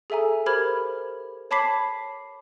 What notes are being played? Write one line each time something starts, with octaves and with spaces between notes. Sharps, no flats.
G#4 A4 E5 G#5 A#5
G4 A#4 C5 B5 F6 G#6
C#5 A5 B5 D6 B6 C7